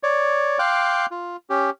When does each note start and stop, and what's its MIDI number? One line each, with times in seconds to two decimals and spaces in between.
0.03 0.58 73
0.03 0.58 74
0.59 1.06 77
0.59 1.06 79
0.59 1.06 84
0.59 1.06 86
0.59 1.06 90
1.11 1.36 65
1.50 1.70 61
1.50 1.70 67